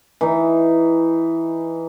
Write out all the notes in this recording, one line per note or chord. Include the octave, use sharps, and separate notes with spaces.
E3 D#4